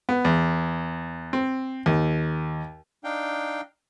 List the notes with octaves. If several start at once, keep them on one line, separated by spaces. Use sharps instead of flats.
B3
E2
C4
D#2
D4 D#4 F5 G5